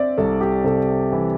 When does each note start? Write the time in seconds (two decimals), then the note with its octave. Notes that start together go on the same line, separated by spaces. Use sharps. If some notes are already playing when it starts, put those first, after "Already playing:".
Already playing: C4 D5 E5
0.18 C2 A4
0.41 G4
0.64 C3 A4
1.12 E3